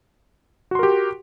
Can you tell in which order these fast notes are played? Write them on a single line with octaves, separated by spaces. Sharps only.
F#4 C6 A#4 G4